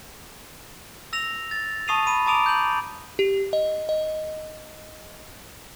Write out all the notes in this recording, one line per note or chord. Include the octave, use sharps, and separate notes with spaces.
E6 A#6 F7
A6
A5 C#6 D#6 C7 D#7 F7
B5 D#7
A5 A#5 D6 D#6 D7 F7
G6 F#7
G4
D#5
D#5